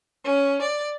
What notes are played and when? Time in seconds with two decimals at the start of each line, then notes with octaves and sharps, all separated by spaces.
0.24 C#4
0.62 D5